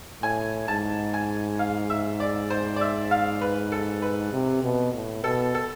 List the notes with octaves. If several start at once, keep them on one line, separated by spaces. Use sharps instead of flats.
A2 G#5
G#2 A5
G#5
F5
E5
D5
C5
D5
E5
F5
B4
A4
B4
C3
B2
A2
B2 A4
A4